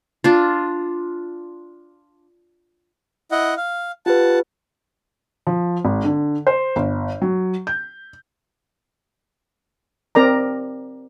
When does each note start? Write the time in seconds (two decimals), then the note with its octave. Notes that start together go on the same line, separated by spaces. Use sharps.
0.24 D4 F4
3.31 E4 D#5 F#5
3.57 F5
4.06 F4 G4 B4 F#5 A5
5.47 F3
5.85 G#1
6.04 D3
6.47 C5
6.76 G1
7.22 F#3
7.67 G6
10.15 C4 A#4 D5 A#5